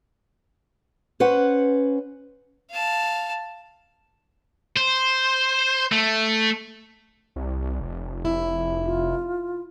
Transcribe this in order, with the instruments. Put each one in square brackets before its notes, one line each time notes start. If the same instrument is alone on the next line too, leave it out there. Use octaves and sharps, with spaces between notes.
[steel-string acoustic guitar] C#4 B4 C5 F#5
[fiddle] F5 A5
[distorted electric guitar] C5
A3
[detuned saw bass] C2
F1
[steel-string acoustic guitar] E4
[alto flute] F4